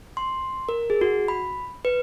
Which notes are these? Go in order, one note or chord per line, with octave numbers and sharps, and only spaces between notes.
C6
A#4
G#4
F#4
B5
B4